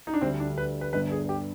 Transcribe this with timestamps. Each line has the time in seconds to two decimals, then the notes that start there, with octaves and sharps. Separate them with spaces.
0.07 D#4
0.14 D4
0.21 D2 D3 G3 C4
0.40 D4
0.58 B4
0.81 B4
0.93 G1 G2 D3 B4
1.12 G#4
1.29 G4